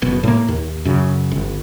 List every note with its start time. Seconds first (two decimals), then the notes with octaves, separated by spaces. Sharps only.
0.02 F#1 B2
0.23 A2 A3 A#3
0.48 D#2
0.85 F#2 C#3
1.32 G1